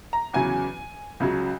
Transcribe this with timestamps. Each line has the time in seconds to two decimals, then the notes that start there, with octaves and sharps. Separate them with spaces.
0.13 A#5
0.33 E2 C#3 F#3 G#5
1.20 C#2 C#3 F#3